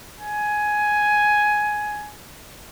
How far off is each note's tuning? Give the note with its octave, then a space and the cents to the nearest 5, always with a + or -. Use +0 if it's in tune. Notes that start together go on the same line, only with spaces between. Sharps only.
G#5 +10